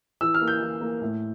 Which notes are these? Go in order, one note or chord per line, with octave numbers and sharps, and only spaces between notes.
E3 E6
F6
A#3
G6
E3
A#3
A2